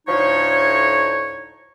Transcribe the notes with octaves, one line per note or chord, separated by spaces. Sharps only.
D2 A2 F3 D#4 C#5